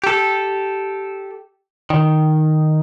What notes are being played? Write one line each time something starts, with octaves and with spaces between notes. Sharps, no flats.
G4 A4
D#3